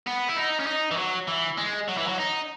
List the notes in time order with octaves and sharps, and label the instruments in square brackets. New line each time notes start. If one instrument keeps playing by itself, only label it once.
[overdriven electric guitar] B3
E4
D#4
C#4
D#4
E3
F#3
E3
G#3
F#3
E3
F#3
D#4